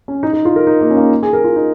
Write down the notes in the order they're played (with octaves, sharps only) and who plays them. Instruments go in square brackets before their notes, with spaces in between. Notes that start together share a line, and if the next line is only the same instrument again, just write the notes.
[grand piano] C#4
D#4
D#4
F4
A#4
D#4
A#3
C#4
A#3
G#4
A#4
F4
D#4